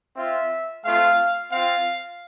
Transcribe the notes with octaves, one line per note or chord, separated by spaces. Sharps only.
C4 F4 E5
A3 C4 F4 F5
C4 F4 F5